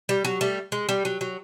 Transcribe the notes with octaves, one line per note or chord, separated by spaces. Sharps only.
G3
F#3
G3 A3
G#3
G3
F#3
F#3